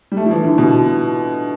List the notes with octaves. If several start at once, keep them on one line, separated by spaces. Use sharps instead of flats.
G3
A3
F3
E3
D3
B2